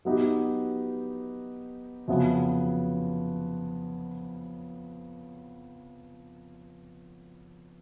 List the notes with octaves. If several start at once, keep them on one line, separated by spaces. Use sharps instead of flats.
F#3 B3 D#4 G4
F2 C#3 F#3 B3